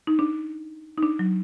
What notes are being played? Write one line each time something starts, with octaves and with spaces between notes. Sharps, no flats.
D#4
D4
D#4
D4
F#3